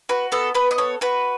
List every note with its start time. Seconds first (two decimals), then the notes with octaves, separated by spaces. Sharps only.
0.09 F#4 B4
0.32 B3 A4
0.55 B3 B4
0.71 D#5
0.78 A4 C#5
1.01 F#4 B4